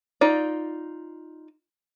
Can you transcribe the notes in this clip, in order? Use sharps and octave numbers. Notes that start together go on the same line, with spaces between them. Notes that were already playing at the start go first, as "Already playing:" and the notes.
D#4 F4 D5